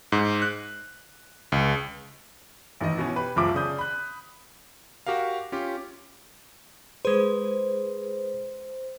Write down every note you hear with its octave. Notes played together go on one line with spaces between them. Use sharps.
G#2
F#6
C#2
A1 D#3 D#5
B2 E3 C#4
G4 B4
F#1 C#2 F3 E5 D6
C#3 D5 D#6 G6
B5 F#6
F#4 G4 A#4 F5
C#4 F4 G4
G#3 G#4 B4 C5